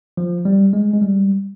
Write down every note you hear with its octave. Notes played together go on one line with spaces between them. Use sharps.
F3
G3
G#3
G#3
G3